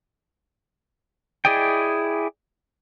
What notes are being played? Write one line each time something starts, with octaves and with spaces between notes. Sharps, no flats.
E4 G#4 D5 D#5 G5